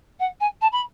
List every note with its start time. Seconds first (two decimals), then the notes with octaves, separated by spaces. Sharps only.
0.20 F#5
0.41 G#5
0.61 A5
0.72 B5